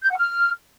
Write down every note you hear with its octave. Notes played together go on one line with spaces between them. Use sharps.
G6
F#5
F6